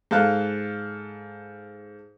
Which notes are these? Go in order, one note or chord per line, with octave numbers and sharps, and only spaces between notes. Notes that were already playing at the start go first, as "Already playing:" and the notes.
G#2 A4 F5 F#6